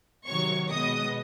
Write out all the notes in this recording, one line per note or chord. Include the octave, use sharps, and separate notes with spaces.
C3 D#3 F#3 C#5 C#6
B2 G#3 B3 D#5 D#6